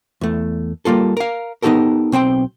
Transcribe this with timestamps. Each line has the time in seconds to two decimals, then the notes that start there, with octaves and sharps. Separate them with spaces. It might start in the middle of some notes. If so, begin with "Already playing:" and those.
0.21 E2 A3
0.85 G3 A#3 F4 A4
1.17 A#4 F5
1.62 B3 D#4 F#4 G4 A4 A#4
2.12 B1 C4 C5 G5